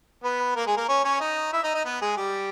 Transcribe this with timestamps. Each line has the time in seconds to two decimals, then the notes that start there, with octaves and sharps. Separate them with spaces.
0.24 B3 B4
0.55 A#3 A#4
0.66 G#3 G#4
0.77 A#3 A#4
0.89 C#4 C#5
1.04 C#4 C#5
1.20 D#4 D#5
1.53 E4 E5
1.63 D#4 D#5
1.74 D#4 D#5
1.85 B3 B4
2.01 G#3 G#4
2.17 G3 G4